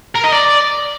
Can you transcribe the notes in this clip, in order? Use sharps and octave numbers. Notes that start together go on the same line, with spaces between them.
A#4
D#5
D5